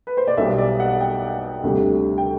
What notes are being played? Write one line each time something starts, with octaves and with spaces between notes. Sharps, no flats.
B4
C5
D5
B1 B2 G3 E5
D5
F#5
G5
D2 C3 G3
G5